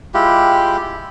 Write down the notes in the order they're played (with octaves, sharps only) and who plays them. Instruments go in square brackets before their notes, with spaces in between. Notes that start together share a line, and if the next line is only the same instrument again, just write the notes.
[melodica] G#3 E4 F4 G4